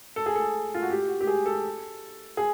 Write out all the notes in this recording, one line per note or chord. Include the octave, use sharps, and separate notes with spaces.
A4
G#4
A4
F4
F#4
G4
F#4
G4
G#4
A4
G#4